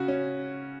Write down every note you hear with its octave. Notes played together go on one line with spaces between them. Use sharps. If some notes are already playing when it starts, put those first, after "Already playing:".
Already playing: C#3 F#4
C#4